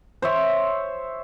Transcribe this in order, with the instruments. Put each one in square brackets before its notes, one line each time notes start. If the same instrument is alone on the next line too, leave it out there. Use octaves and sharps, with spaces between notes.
[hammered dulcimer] C5 C#5 E5